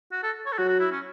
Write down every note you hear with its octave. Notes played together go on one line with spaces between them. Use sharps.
F#4
A4
C#5
A4
F#3 F#4
F#4
E4
C#4